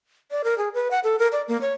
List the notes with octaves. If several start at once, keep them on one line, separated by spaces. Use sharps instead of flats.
D5
A#4
G#4
B4
F#5
A4
A#4
D5
A#3
C#5